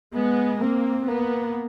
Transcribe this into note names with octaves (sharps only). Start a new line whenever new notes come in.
G#3 B3
A#3 C4
A#3 B3